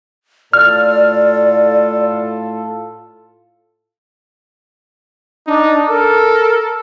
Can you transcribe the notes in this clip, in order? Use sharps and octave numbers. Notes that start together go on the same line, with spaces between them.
A2 F4 A4 D5 F6
D4 D#4
A4 A#4